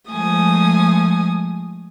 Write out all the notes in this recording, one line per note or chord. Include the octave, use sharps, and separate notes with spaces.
F3 G#3 A3 G#5 D#6